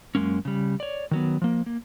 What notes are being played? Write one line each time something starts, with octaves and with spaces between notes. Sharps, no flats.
F#2 C3 G#3 A#3 C#4
C#3 G3
C#5 D5
D#3 F#3 B3
F3 A#3
A#3